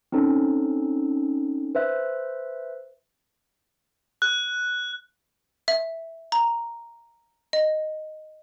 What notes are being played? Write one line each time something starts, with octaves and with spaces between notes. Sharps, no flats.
C4 C#4 D#4 A4
B4 C5 E5 F#6
F#6
E5
A#5
D#5